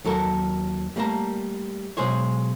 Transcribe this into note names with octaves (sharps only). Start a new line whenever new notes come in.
D#2 F#3 A4 A#4
G3 A3 A#3 A5 A#5
B1 F2 G#3 G#4 C5 C#5